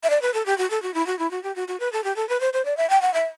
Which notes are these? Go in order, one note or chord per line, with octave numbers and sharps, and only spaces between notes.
E5
D5
B4
A4
G4
F#4
A4
F#4
E4
F#4
E4
F#4
G4
F#4
F#4
B4
A4
G4
A4
B4
C5
C5
D5
E5
G5
F#5
E5